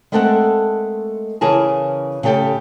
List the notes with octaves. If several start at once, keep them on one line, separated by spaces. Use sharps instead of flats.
G#3 A3 C4 A4 A#4 F#5
C#3 E3 G#4 A#4 A5
C#3 A3 G4 A4 G5